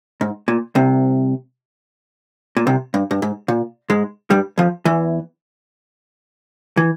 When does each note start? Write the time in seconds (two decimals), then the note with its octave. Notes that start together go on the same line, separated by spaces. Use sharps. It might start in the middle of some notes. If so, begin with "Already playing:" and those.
0.21 G#2
0.48 A#2
0.75 C2 C3
2.57 A#2
2.67 C2 C3
2.94 G2
3.11 G2
3.22 G#2
3.48 A#2
3.90 G#2 G#3
4.30 G2 G3
4.58 F2 F3
4.85 E2 E3
6.77 E3